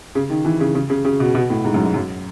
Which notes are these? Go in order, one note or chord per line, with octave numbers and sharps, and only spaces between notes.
C#3
D#3
E3
C#3
C#3
C#3
C#3
B2
B2
A2
G#2
F#2
G#2
F#2